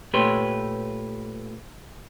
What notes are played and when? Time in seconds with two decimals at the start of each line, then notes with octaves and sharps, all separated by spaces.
0.13 A#2 A3 G4 B4 C#5 C6